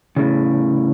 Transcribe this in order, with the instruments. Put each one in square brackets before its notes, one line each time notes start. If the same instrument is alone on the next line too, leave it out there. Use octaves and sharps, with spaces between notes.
[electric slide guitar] A2 C#3